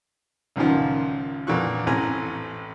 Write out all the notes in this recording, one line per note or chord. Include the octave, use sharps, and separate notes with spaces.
C#2 F#2 A#2 D#3 F3
F2 A#2 D3 E3 C#6 F#6
A1 A2 C4 G#5 A#5